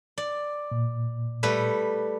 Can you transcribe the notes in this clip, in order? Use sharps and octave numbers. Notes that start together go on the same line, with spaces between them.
D5
A#2
G3 A3 B4